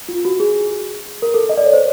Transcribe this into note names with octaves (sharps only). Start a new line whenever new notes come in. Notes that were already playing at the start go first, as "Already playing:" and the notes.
F4
F#4
G#4
A#4
A4
D#5
D5
C#5
C5